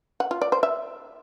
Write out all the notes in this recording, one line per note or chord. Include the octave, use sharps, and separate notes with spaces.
F#5
F4
D5
C5
E5